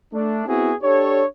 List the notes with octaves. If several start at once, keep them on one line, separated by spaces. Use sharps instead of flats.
A3 D4
B3 C4 E4 F#4 G#4
D4 G4 A4 C#5